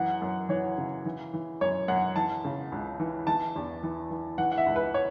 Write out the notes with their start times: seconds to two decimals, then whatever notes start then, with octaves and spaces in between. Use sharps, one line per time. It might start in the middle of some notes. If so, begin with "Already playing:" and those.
Already playing: F#2 E3 F#5
0.22 F#2
0.49 E3 C#5
0.78 C#3
1.06 E3
1.33 E3
1.61 F#2 C#5
1.88 F#2 F#5
2.16 E3 A5
2.45 C#3
2.72 C#2
3.00 E3
3.27 E3 A5
3.56 E2
3.83 E3
4.11 E3
4.38 E3 F#5
4.52 F#5
4.57 E5
4.66 C#2
4.76 B4
4.94 C#5